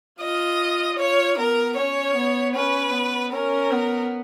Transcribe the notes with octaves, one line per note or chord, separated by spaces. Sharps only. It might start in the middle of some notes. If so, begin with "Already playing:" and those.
F4 D#5
F4 C#5
B3 A#4
C#4 C#5
B3
C#4 B4
B3
C#4 A#4
B3